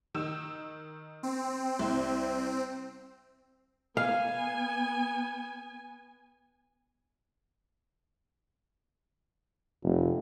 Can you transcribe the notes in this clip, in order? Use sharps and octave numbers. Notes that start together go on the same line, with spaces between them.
D#3 D#4 E6
C4
C2 E4 C6
B3 F5 G#5
F1